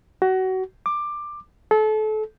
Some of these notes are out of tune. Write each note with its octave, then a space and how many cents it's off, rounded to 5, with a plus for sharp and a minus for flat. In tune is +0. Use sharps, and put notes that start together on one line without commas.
F#4 +25
D6 +15
A4 -30